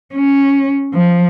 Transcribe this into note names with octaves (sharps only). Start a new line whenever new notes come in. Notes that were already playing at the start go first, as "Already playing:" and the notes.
C#4
F3